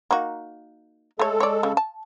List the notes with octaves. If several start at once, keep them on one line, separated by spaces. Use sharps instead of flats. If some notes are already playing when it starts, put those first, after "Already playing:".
A#3 D#4 F#4
G#3 A3 A4 C#5
C#5 D5
C#3
A5